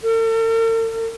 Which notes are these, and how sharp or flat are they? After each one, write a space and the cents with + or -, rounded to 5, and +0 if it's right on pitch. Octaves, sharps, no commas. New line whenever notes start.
A4 +45